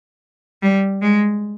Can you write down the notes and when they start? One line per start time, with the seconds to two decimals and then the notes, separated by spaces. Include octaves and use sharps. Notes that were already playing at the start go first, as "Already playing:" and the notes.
0.63 G3
1.02 G#3